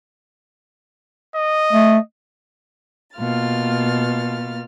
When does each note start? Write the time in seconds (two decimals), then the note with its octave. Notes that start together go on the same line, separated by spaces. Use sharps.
1.36 D#5
1.73 A3
3.17 B2 A#3 F4 F6 A6